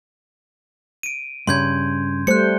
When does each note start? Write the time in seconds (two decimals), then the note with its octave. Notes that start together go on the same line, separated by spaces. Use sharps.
1.03 D7 D#7
1.47 G2 C#3 C6 G6 G#6
2.27 G3 A3 C5 F#6 C#7